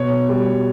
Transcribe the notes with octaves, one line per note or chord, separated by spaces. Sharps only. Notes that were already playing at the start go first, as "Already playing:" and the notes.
Already playing: B2 C#5
G3